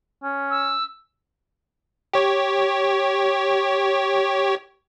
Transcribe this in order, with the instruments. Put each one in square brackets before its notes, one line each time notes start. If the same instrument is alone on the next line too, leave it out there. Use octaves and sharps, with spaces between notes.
[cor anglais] C#4
[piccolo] E6
[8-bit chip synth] G4 C#5